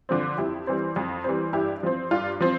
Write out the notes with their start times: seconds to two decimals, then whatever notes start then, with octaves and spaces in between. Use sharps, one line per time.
0.09 D3 F3 C4
0.38 F2 E4 G4
0.67 E3 G3 C4
0.96 F2
1.24 E3 G3 C4
1.53 G2 E4 G4
1.83 F3 C4
2.11 G2 F4
2.40 F3 C4